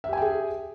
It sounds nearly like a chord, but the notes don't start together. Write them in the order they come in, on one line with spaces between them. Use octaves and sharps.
E5 G4 G#5 G5 G#4